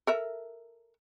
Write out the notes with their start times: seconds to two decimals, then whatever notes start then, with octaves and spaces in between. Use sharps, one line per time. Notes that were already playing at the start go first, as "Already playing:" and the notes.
0.07 A4 A#4 E5